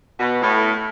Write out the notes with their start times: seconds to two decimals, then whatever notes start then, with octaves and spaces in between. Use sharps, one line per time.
0.19 B2
0.42 A2